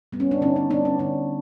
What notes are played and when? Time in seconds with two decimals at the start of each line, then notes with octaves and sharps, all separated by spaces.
0.13 G3 B3
0.20 C#4
0.31 D4
0.41 D3 C#4 D#4
0.56 C#4
0.70 B3 D4
0.74 G3
0.85 C#4
0.99 D3 D4